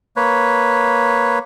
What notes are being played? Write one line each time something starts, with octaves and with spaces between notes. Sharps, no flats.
A#3 B4 C#5